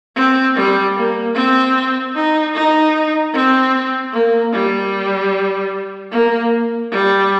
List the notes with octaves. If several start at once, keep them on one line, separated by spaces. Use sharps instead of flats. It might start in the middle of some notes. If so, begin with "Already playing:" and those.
C4
G3
A#3
C4
D#4
D#4
C4
A#3
G3
A#3
G3